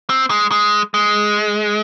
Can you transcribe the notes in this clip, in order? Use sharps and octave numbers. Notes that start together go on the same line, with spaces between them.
C4
G#3
G#3
G#3